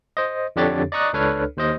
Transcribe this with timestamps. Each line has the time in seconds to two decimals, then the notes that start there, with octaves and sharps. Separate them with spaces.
0.17 C5 D#5
0.56 F2 D3 D4 G4 C#5 A6
0.92 D5 D#5 A#5 C#6 D#6 F#6
1.13 C#2 D4 A4 B4 C#5 F6
1.57 D#2 C5 D#5